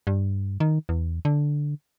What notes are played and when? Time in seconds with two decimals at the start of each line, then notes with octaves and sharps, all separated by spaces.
0.07 G2
0.60 D#3
0.89 E2
1.25 D3